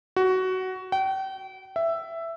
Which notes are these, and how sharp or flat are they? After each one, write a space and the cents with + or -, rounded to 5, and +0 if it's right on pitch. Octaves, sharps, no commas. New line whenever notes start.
F#4 +15
G5 -35
E5 +10